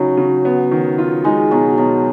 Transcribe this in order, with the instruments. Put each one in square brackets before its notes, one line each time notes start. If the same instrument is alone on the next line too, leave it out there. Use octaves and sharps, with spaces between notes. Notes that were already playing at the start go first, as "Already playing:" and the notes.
Already playing: [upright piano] C#3 D#4 [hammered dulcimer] F#3
[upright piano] C#3
B3
D#3
F4
[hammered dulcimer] G#3 [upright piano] D#4
[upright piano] B2 [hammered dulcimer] F#3
[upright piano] B2 [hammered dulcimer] F#3